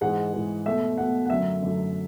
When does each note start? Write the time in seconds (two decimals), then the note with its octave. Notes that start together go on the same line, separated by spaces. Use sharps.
0.01 G#2 E3 G#3 F#5
0.33 G#2 E3 G#3
0.66 B2 A3 E5
0.98 B2 A3 F#5
1.25 F#5
1.29 F#2 D3 F#3 A3 E5
1.62 F#2 D3 F#3 A3